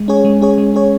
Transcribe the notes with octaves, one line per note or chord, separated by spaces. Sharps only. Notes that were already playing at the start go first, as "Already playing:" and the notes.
Already playing: G#3
C#4 G#4 C#5
G#3
C#4 G#4 C#5
G#3
C#4 G#4 C#5